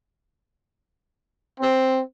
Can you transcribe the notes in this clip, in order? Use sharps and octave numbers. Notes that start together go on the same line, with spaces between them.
C4